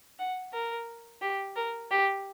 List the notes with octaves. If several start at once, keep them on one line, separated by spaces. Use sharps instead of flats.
F#5
A#4
G4
A#4
G4